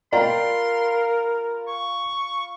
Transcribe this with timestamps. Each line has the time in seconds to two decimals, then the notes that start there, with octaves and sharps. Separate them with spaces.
0.13 F4 A#4 B4 D5 G5 A#5 C6
1.68 C#6